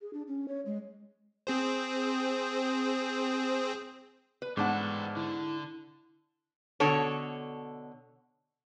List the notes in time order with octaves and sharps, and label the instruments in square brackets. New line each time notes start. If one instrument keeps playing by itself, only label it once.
[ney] G#4
D4
C#4
C#5
G#3
[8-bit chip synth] C4 G#4 C5
[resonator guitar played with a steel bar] B4
[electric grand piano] G#2 [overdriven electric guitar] E3 A4 [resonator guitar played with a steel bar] B3 D4 F#5 [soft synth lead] C#6
[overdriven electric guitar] D3 [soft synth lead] E4
[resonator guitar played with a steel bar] B2 D3 A4 C#5